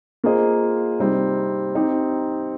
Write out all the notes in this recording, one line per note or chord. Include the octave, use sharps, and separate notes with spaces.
A#3 F4 G#4 C5 D#5
C3 G3 C4 D#4
C4 D#4 G4